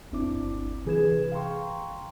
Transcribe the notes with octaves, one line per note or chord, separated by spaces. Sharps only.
G1 D2 C4 D4 E4 D6
C3 E3 G#4 B4 G#6 E7
F5 G5 A#5 C6 C#6